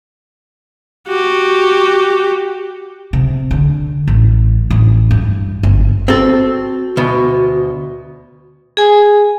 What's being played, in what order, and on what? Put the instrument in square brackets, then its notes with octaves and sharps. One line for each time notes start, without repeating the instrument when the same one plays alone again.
[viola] F#4 G4
[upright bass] C3
D3
A1
A1
G2
G1
[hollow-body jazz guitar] C4 A4 [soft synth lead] F#4
[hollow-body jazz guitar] D2 B2
[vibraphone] G#4 G#5